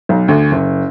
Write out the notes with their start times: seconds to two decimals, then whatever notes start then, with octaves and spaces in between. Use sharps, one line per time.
0.09 B1
0.28 D2
0.51 F#1